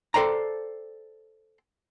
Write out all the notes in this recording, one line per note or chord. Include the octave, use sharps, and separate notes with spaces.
A4 B4 C5 D5 G5 A#5